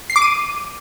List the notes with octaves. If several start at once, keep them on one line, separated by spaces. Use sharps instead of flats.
C7
D6
D#7